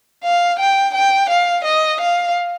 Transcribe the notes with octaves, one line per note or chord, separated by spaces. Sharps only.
F5
G5
G5
F5
D#5
F5